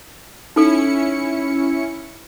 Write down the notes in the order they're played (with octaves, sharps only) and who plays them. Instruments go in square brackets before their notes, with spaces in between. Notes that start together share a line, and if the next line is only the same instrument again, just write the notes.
[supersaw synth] C#4 E4 C#7 [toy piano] D#4 A4